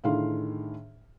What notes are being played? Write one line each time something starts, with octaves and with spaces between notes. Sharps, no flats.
A2 D3 D#3 G#4 F5 C6